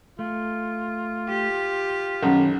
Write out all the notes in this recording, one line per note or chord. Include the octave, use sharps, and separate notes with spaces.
A3 F4
G4
B1 F#2 D#3 C#4 A4